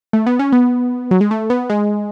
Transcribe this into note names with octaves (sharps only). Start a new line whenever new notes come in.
A3
B3
C#4
B3
F#3
G#3
A3
B3
G#3